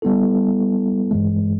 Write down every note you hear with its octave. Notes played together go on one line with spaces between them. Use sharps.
G3 B3 E4 A4
G2 E3 G#3